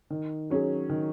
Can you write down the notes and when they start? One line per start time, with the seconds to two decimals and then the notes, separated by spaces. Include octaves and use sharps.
0.10 D#3
0.50 F#3 C#4 G#4
0.90 D#3